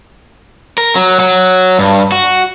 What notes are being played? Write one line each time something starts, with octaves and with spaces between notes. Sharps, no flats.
A#4
F#3
F#3
G2
F#4